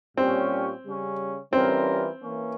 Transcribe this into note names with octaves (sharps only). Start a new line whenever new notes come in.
A#2 G3 C4 C#4 G4
C#3 G3 C#4
E3 G3 C4 C#4 F4 A#4
E3 A#3 C#4